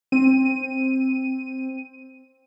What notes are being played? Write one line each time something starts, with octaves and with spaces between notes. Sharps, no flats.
C4 D#7